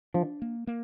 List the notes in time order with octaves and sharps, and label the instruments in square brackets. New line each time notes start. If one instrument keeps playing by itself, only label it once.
[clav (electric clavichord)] F3 [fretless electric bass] D4
[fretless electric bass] A#3
A#3